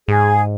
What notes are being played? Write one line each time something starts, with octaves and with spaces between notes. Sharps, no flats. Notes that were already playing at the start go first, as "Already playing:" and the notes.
G#2 G#4